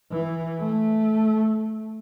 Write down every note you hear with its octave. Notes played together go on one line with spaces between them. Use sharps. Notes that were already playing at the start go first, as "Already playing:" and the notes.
E3
A3